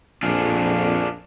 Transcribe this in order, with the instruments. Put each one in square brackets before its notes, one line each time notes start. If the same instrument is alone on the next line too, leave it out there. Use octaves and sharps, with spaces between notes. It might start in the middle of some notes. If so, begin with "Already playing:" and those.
[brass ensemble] A#1 F2 [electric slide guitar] D4 F4 G#4